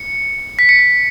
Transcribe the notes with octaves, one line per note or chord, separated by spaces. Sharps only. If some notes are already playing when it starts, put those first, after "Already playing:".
Already playing: C#7
B6
C#7
B6